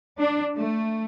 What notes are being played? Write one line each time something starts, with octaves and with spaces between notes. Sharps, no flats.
D4
A3